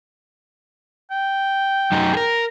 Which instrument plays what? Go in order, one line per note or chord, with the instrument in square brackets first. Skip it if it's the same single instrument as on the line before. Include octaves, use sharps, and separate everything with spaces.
[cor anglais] G5
[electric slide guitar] F#2 D#4
G#4 A#4